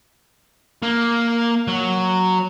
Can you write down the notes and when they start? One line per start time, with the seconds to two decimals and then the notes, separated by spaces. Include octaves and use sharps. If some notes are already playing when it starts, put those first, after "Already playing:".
0.82 A#3
1.67 F#3